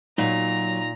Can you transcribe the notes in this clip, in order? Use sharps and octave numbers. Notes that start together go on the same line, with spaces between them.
A#2 F#3 D#4 A#5